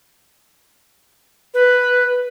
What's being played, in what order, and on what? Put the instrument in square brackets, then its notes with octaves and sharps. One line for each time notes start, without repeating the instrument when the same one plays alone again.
[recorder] B4